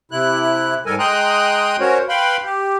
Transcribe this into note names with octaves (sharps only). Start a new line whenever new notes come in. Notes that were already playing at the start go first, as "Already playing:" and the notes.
C3 E4 F#6
G#2 G3 A4 A#4 G#5
G#3 G5 A#5 C6 D#6 F#6
C#4 F#4 A#4 C5 C#5
B4 F5 G5 B5 C6
G4